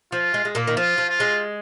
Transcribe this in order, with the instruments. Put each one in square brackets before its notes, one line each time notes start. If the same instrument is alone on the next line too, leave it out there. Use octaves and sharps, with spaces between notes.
[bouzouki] F3 [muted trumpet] F4
[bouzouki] G#3
G#3
A#2 A#3
D#3
[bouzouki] F3 [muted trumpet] F4
[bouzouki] F3
[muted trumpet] F4
[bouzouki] G#3